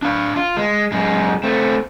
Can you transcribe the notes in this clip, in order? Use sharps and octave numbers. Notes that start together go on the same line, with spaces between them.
D4 F5
F4
G#3
F#2 G#3
A3 C4